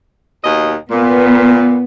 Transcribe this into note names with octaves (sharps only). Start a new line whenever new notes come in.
D#2 B2 D#5
A#2 B3